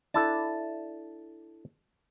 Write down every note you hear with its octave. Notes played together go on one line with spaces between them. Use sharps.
D4 E4 A4 A5